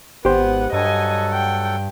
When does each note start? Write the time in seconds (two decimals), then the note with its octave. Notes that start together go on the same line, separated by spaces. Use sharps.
0.25 G#1 B3 G4 C5 F#5
0.73 G2 F#3 A4 D#5 F#5 G#5
1.34 G5